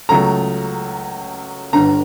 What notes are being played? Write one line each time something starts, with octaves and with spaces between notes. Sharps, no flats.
C#2 C#3 F#3 A3 A#5
G1 G2 D3 A#5